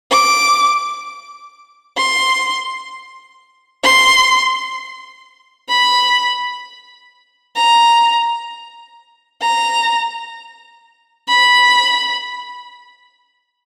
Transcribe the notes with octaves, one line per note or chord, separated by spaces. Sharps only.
D6
C6
C6
B5
A#5
A#5
B5